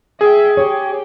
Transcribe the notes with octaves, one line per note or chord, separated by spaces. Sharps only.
G#4 E5 G5
G4 C#5 G5